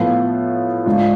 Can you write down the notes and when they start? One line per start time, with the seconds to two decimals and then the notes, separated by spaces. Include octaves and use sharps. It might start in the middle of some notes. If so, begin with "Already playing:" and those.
Already playing: A2 F3 B3 F4
0.86 G#2 G#3 D4 F4